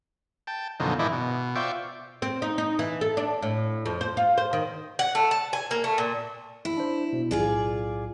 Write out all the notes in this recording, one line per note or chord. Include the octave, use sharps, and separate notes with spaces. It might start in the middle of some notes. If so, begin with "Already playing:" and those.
G5 A5
F#2 B2 D3 F3 D#4
G#2 D#3 E3 E4 D5 D#5
B2
F4 C5 D5 E5 G5 C#6
C4
D#4
D#4
E3
A4
D4
A2
F2
C5
F4
C5
D#3
F#5
A3
A5
G#5
A#3
A3
A#2
E4
D4 C5
B2
B1 A2 F4 G#4 D5